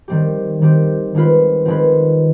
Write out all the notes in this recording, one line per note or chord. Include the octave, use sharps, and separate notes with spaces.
D#3 G3 C4 G4
D#3 G3 C4 G4
D#3 G#3 C4 F4 B4
D#3 G#3 C4 F4 B4